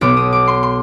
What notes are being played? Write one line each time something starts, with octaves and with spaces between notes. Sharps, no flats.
B1 B2 B3 D6
D#6
D6
C6
C6